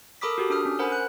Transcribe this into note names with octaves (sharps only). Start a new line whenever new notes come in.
A4 A#4 B5 D6 D#6 B6
F#4 G4 A4
D4 A4 D#6 F6
C#4
A#4 C5 F#5 G#5 B5
F#6